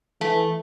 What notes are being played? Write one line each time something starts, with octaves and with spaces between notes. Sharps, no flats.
E3 A3